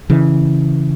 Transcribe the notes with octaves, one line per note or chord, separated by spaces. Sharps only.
C#3 E3